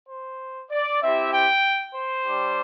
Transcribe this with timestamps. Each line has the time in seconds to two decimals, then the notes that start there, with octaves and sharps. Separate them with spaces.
0.09 C5
0.71 D5
1.01 C4 E4 G4 E5
1.32 G5
1.94 C5
2.25 G3 D4 G4